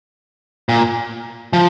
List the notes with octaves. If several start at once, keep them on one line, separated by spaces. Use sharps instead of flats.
A#2
F3